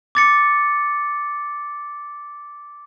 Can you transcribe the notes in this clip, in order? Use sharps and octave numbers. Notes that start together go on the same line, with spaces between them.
D6 A6 C#7